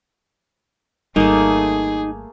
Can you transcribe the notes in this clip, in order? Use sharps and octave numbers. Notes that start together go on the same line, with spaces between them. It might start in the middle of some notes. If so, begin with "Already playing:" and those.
G#1 G3 A3 A#3 D#4 G#4